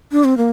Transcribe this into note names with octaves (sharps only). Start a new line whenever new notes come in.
D4
C4
A#3